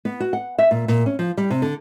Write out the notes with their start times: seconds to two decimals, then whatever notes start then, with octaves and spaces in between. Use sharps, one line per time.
0.05 B3
0.20 F#4
0.33 F#5
0.58 E5
0.71 A#2
0.88 A#2
1.06 C#4
1.19 F3
1.38 G3
1.50 C3
1.62 D3